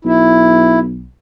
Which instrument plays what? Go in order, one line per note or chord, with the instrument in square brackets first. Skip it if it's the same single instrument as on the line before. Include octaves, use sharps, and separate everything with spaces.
[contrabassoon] B1 [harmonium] E4